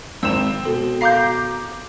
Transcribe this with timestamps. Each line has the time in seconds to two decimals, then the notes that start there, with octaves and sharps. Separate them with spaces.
0.23 G#1 C4 E6 E7
0.65 B2 A4
1.01 F5 A#5 D6 G6 C7